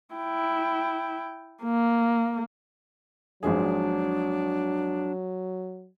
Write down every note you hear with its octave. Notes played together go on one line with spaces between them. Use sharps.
E4 G5
A#3
G#1 F3 F#3 D4 G#4